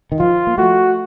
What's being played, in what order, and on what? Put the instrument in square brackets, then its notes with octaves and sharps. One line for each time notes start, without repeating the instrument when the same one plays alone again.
[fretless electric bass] D#3
[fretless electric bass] F3 [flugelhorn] F4
[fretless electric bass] A#3
[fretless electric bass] A3 [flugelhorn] F#4